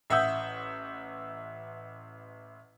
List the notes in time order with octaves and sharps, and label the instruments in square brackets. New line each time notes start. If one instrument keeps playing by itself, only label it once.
[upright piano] A1 E5 F#5 D#6 E6 G6